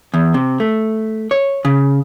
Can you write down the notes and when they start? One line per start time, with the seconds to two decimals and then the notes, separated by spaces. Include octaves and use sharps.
0.14 E2
0.34 C3
0.60 A3
1.31 C#5
1.65 C#3